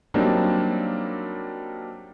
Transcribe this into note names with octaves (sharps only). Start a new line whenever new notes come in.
F#3 G3 A#3 C4 D4 D#4